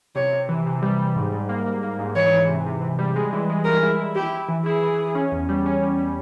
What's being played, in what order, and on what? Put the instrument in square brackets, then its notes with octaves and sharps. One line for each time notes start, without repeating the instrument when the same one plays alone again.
[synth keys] C3 [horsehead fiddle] C#5
[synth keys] C3
E3
C3
G3
G3
G#2
G#2
A#3
A#3
A#3
G#2
[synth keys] E3 [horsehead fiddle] C#5
[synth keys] E3
C3
C3
E3
G3
G#3
E3
G#3
[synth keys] E3 [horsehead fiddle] A#4
[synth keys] E4
E4
[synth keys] E4 [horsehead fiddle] G4
[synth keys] E4
E3
[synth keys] E4 [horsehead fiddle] G#4
[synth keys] E3
E3
C#4
E2
G3
C#4
G3
G3